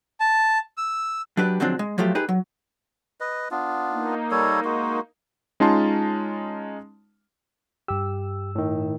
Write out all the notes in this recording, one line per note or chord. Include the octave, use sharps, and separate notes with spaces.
A5
E6
F#3 D4 G4 B4
D3 F3 F#3 G#3 C4 D4
G#3
F3 F#3 A3 F4 G4
D#4 G4 G#4 B4
F#3
B4 D#5
B3 D4 F4
A#3 D#4
G3 A4 C#5
G#3 F#4
G#3 C#4 D#4 F4 A5 C6
G2 G4 E6
A2 D#3